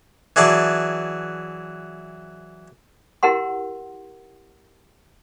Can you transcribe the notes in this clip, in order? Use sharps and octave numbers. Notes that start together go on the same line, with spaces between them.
E3 F#3 G#4 D5 A5
E4 G4 A#4 F#5 C6